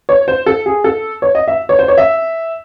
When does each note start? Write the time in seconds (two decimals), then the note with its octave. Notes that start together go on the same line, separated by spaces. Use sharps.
0.09 C#5
0.28 C5
0.46 A4
0.66 G#4
0.84 A4
1.22 C#5
1.35 D#5
1.48 E5
1.69 C#5
1.79 C5
1.88 C#5
1.98 E5